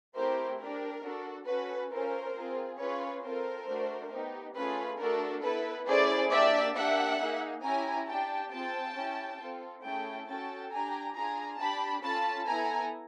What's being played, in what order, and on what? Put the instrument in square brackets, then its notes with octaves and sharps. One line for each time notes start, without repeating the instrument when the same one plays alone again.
[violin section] A3 C4 E4 G4 A#4 C5
D4 G4 A#4
D4 F#4 A4
C#4 F#4 A4 B4
C#4 F4 A4 A#4 C5
C4 F4 G#4
C#4 F4 G#4 B4 C#5
C4 F4 A4 A#4 C5
A3 D4 F#4
B3 D#4 G4
A3 C#4 F4 G#4 B4
A3 D4 F#4 A4 A#4
B3 E4 A4 B4
A3 C#4 E4 G#4 C5 D5
A#3 D4 G4 D5 E5
A#3 D4 G4 E5 F#5
A#3 D#4 G#4
C#4 E4 G4 G#5 A#5
D4 G4 G5 A5
C4 F4 G#4 G5 A5
C#4 E4 G4
C4 F4 A4
A3 C#4 E4 G#4 G5 A5
C#4 F#4 A4 G5 A5
D4 G4 G#5 A#5
D4 F4 G#4 G#5 A#5
D4 G4 A5 B5
C#4 F4 A4 A5 B5
B3 E4 A4 G#5 A#5